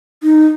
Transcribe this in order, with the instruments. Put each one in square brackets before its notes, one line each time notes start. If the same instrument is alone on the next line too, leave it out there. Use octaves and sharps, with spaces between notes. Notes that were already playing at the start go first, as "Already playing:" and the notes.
[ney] D#4